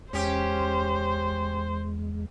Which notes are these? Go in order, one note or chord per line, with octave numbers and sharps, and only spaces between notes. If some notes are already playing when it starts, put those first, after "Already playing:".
E2 G#3 C#4 G4 C5